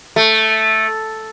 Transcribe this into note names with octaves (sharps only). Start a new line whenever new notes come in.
A3